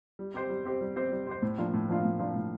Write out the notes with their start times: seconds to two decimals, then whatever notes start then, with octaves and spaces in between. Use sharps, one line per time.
0.19 G3
0.34 C4 G4 C5
0.49 G3
0.65 C4 G4 C5
0.81 G3
0.96 C4 G4 C5
1.11 G3
1.27 C4 G4 C5
1.42 A2
1.58 F3 A#3 D4 F4
1.73 A2
1.89 F3 A#3 D4 F4
2.05 A2
2.19 F3 A#3 D4 F4
2.35 A2